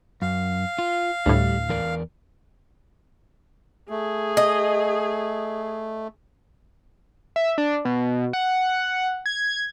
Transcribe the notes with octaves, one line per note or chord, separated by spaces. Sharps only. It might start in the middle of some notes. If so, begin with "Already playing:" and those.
F#2 F5
F4
D2 A2 G3
E2 A#4 D5
A3 G#4
D#5
E5
D4
B2
F#5
G#6